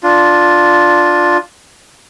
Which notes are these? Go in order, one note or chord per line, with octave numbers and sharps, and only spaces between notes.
D4 F4